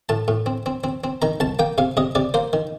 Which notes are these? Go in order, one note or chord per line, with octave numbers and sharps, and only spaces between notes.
A2 A5
A2
C4
C4
C4
C4
D#3 A#5
C2 A5
A#3 G5
C3 F5
C3 D#5
C3 D5
A#3 C5
D#3